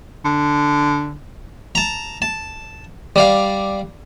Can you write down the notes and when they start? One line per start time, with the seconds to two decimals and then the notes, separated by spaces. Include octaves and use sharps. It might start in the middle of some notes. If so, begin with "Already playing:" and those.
0.25 D3
1.75 A5 A#5
2.22 A5
3.16 G3 D5 F5